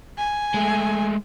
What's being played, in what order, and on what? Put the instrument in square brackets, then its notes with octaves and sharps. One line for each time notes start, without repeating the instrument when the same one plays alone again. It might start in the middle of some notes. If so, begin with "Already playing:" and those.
[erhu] G#5
[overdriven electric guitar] G#3 A3